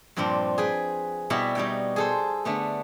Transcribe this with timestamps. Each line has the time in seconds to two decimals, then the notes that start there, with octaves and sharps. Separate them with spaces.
0.17 G2 A#2 F3 G3 C4
0.58 G#4 B4 G5
1.30 B2 G3 B3 E4 G4 B4
1.55 G3 D#4 C#5 G5
1.96 G#4 A4 C5
2.45 D3 A3 B3